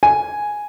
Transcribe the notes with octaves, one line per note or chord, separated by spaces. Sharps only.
G#5